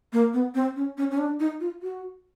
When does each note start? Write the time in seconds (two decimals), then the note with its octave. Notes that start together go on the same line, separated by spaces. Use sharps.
0.13 A#3
0.33 B3
0.54 C4
0.76 C#4
0.97 C#4
1.11 C#4
1.18 D4
1.40 D#4
1.60 F4
1.82 F#4